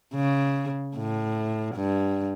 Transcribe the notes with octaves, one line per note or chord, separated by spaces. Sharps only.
C#3
A2
G2